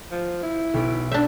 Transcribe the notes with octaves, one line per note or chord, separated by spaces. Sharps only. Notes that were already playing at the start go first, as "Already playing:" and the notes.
F3
E4
B1 B6 D7
D4 E5 G6 B6